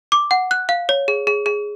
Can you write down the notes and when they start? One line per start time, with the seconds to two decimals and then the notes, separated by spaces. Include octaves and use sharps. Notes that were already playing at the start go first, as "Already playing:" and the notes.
0.12 D6
0.31 F#5
0.51 F#6
0.69 F5
0.89 C#5
1.08 G#4
1.27 G#4
1.46 G#4